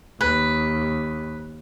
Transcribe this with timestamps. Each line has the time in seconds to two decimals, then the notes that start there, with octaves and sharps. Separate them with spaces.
0.21 D#2 B4